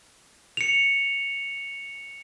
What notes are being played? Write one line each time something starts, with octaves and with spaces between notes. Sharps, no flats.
C#7 F7